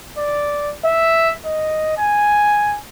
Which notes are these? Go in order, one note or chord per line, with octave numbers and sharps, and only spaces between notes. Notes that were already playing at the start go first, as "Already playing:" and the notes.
D5
E5
D#5
G#5